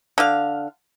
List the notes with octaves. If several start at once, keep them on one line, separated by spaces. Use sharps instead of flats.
D3 F5